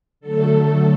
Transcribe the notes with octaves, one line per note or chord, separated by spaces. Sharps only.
D3 F#3 A3 A4